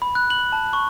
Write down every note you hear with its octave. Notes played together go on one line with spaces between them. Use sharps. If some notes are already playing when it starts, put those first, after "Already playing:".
B5
F#6
F#7
A5
C#6